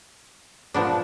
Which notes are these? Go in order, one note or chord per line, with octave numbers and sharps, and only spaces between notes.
A#2 F3 B3 D4